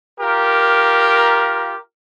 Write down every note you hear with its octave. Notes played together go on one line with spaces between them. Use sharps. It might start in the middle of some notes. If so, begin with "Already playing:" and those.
F4 G4 A#4